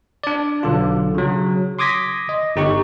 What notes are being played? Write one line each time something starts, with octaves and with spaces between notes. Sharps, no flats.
D4 D5
B1 D3 F4
C#3 F#3
C6 D6 D#6 G#6 A#6 B6
D#5
G1 D#4 G4 C#6